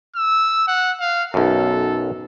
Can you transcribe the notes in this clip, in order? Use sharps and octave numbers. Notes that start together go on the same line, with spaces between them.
E6
F#5
F5
B1 F#2 A4